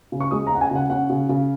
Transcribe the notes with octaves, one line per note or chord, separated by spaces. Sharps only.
C#3
C#6
G#3 D#6
A#5
C#4 F#5
G#5
C#3 F#5
C#4 F#5
C#3
C#3